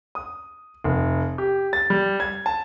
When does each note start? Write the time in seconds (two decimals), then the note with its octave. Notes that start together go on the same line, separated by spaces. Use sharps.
0.15 D#6
0.84 F1
1.38 G4
1.73 A6
1.90 G3
2.20 G#6
2.46 A5